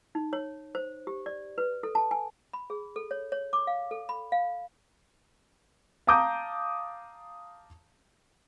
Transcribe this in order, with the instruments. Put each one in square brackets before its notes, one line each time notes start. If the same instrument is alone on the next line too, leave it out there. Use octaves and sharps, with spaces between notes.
[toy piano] D#4
C#5
C5
G4
D5
B4
A4
A5
G#5
B5
G#4
A4
C#5
C#5
D6
F5
A4
B5
F5
[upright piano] F5 A5 A#5 D6 D#6 G6